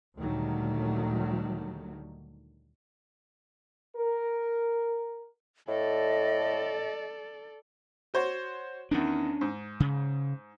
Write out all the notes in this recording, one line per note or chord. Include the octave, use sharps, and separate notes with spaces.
D2 A#2 D#3 F#3 G3 A3
A#4
A2 A4 D5 D#5
F#4 C5 C#5
E2 D#3 C#4 D4
G#2
C#3